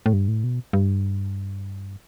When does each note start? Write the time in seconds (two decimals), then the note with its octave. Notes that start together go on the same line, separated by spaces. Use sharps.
0.06 A2
0.13 G2
0.28 A2
0.44 B2
0.73 G2